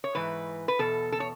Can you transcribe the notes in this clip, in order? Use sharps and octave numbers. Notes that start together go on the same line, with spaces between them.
C#5
G#2 E3 B4
B4
E2 B2 A4
A4
C#5